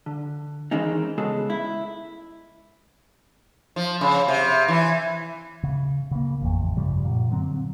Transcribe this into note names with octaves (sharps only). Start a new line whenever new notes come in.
D3
D#3 E3 G#3 C4 C#4 D#4
C#3 G#3 B3 G#4 A4
E4
F3
C#3
C3
E3
C#3
C#3 A#3
A1 F2
G2 C#3 F3 G3
F#2 A#2
D3 F#3 C4